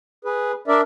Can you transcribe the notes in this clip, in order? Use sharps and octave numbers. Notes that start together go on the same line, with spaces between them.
G#4 B4
D4 A#4 D5 E5